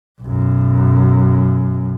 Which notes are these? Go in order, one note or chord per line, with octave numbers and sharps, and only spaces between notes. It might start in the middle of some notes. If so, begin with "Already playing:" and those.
B1 F#2